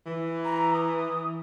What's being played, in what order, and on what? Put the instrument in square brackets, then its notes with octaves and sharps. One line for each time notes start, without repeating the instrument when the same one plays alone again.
[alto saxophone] E3
[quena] A#5
D#6